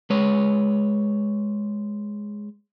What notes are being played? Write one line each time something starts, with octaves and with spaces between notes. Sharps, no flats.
G#3 B4 C#5